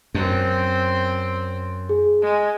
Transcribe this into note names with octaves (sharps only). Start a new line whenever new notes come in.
F#2 C4
G#4
G#3